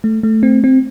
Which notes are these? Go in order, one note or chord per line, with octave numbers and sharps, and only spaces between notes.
A3
A3
C4
C4